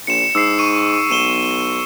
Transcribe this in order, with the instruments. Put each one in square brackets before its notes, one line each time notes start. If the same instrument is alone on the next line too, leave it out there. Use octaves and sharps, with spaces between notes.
[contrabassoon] A#1 [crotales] C#7 E7
[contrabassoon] G#2 [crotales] E6 C7
[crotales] C#6 D#7
[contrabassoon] B1 [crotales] D#7 E7 G7